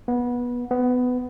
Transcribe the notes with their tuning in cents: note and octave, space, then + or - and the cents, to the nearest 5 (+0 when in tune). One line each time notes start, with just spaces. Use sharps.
B3 -20
B3 +15